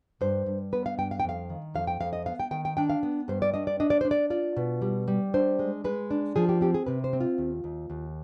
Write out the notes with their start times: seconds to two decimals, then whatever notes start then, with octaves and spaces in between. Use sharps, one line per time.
0.21 G2 C5
0.46 G2
0.73 B3 B4
0.86 F5
0.98 G2 G5
1.11 F5
1.20 G5
1.24 F2 F5
1.50 D#3
1.74 F2 F5
1.87 G5
2.00 F2 F5
2.13 D#5
2.26 B3 F5
2.40 G5
2.51 D#3 G5
2.65 G5
2.77 D4 G5
2.90 F5
3.03 B3
3.28 G2 C5
3.42 D5
3.54 D4 D#5
3.67 D5
3.80 D4 D#5
3.90 D5
4.01 D4 C5
4.11 D5
4.30 F4 D5
4.56 B2
4.82 G3
5.08 G3
5.34 D4 C5
5.59 G#3
5.84 G#3 B4
6.11 D4
6.36 F3 G#4
6.49 G4
6.61 C4 G4
6.74 G#4
6.86 C3 B4
7.04 C5
7.13 C4
7.21 F4
7.38 D#2
7.64 D#2
7.90 D#2